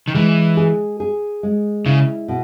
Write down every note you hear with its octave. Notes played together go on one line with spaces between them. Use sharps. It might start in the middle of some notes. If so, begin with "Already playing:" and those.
D#3
E3 G#3
G#4
G#4
G#3
C#3 E4
B2